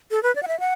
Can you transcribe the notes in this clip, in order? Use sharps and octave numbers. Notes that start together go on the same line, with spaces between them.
A4
B4
D5
F#5
E5
F#5